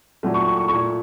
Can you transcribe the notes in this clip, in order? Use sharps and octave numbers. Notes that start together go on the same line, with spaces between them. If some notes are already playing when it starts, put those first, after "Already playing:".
A#2 F#3 A3
C#6
C#6
C#6
A#2 A3 C#6